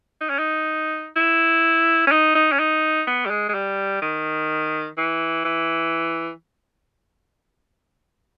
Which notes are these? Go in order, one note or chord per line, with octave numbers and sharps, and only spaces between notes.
D#4
C#4
D#4
E4
C#4
D#4
D#4
C#4
D#4
B3
G3
G#3
G#3
G3
D#3
E3
E3